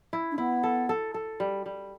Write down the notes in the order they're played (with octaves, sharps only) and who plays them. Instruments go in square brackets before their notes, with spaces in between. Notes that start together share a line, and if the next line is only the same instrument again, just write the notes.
[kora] E4
[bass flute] D4
[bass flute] B3 [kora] E4
[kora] A4
A4
A4
G3
G3